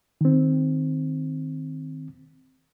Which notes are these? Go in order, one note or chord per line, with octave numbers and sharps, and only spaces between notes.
D#3 C4